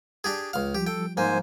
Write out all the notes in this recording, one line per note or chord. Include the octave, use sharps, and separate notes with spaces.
D4 G4 G#4
C#2 F5
F3 G3 G4
A4 G5
G#2 A#3 C5 G#5